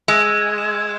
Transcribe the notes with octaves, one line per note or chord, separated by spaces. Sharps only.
G#3 E6
E6
G#6
E7
E6